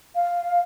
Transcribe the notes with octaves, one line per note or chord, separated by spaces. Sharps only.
F5